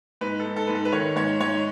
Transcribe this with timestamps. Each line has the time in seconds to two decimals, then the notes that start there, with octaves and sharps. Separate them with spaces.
0.21 G#2 B4
0.40 A4
0.45 G#2
0.56 A4
0.67 G#2 B4
0.75 A4
0.85 B4
0.92 D#3 C#5
1.16 G#2 C#5
1.40 G#2 C#5